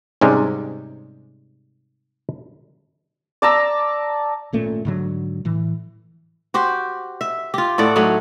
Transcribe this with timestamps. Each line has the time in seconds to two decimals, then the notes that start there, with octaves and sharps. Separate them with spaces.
0.21 G#2 C3 G3 G#3 C#4
3.42 D5 A5 A#5 E6
4.53 G#1 A#2 A3 C#4
4.85 G#2 D3 F#3
5.45 A2 E3
6.54 F#4 G4 C5
7.21 E5
7.54 F4 G4
7.78 A2 A3 D5 F#5
7.96 F#3 A3 D#4